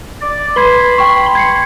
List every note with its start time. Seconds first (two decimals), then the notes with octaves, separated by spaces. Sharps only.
0.21 D5
0.56 B4 B5 C6 G#6
0.98 G5 C#6
1.35 G#6 C7 C#7